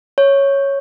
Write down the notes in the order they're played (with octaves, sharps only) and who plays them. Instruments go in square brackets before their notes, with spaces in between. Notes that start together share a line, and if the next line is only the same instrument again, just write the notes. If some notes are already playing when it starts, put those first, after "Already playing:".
[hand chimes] C#5